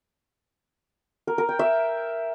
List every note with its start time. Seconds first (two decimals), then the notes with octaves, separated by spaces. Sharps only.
1.27 A#4
1.38 A#4
1.49 G5
1.59 E5